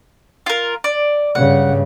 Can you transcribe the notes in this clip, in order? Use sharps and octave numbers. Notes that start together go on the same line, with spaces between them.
F4 A#4
D5
G2 C#3 F#5